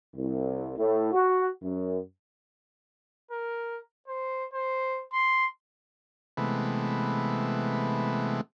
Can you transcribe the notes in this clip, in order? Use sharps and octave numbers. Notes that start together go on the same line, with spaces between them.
C2
A2
F#4
F#2
A#4
C5
C5
C6
C3 E3 G#3 A3 B3